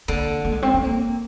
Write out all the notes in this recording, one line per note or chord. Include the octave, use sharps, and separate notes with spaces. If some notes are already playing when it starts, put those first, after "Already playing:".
D3 A#3
A#3
G#3
C4
C4
A#3